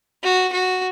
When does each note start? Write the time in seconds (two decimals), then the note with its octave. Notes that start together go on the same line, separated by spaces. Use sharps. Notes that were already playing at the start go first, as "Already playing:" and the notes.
0.23 F#4
0.52 F#4